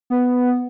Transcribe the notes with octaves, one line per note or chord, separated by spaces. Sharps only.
B3